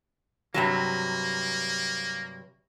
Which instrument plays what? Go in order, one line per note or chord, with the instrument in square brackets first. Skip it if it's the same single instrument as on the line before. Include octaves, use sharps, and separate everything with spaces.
[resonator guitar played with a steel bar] G2 C3 F#3 [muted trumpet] A#3